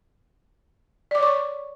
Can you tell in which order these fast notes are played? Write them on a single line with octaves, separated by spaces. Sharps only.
D5 D6 C#5 C#6